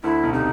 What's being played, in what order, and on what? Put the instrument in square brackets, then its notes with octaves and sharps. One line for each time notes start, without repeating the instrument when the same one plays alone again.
[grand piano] D2 D3 [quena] E4
[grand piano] B1 B2
[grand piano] C3 [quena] D#4